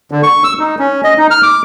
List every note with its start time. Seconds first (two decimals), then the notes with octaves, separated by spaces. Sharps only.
0.11 D3
0.23 C#6
0.44 E6
0.59 D#4
0.79 C#4
1.04 D#5
1.18 D#4
1.31 F6
1.43 D6